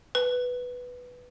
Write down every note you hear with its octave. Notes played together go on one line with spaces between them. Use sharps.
B4